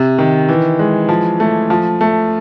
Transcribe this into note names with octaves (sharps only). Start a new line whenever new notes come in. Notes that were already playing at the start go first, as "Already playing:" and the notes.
Already playing: C3
D#3
E3
G#3
F3
A3
F3
A3